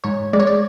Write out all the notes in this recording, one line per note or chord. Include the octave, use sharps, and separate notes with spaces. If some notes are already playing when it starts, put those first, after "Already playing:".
G#2 C#5
G#3 D5
C#5
D5